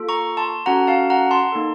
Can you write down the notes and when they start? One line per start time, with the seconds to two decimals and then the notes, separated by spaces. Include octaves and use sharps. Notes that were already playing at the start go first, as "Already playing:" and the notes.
Already playing: A#3 F4 A4
0.09 A#5 C#6
0.37 A5 C6
0.66 C#4 F#4 A4 F#5 A#5
0.87 F5 A5
1.10 F#5 A#5
1.31 A5 C6
1.52 A#3 D#4 A4